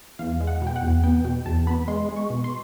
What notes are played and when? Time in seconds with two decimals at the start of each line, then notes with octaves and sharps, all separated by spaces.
0.19 E2 F5
0.40 G#3
0.47 F#5
0.62 B2
0.67 G5
0.76 F#5
0.82 E2
1.04 B3 G5
1.25 B2 G5
1.46 E2 A5
1.67 B3 B5
1.88 G#3 C6
2.09 G#3
2.16 C#6
2.30 B2
2.44 C6